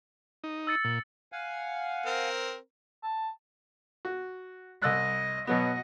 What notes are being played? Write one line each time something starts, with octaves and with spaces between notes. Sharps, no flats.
D#4
E6 A6 C#7
A#2
F5 F#5 G#5
C4 A#4
A5
F#4
C2 D#5 E6 F#6
B2 F#3 B3 F#4 D#5